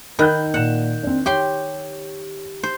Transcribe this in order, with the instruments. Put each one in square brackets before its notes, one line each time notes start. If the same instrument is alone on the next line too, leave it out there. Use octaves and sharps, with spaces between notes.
[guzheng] D#3 [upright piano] B5 F#6 G6
[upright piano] A#2 E7 [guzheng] F#5
[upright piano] C4 D4
[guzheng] G4 G5 C6 [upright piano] C#5
[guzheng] C5